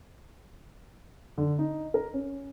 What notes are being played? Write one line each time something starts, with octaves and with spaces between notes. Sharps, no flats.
D3
D#4
A#4
C#4